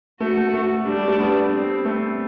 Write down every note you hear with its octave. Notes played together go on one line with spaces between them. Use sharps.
A3 F#4
A3
A3
G3 D4
G3
A3
G3 B3
C4
A3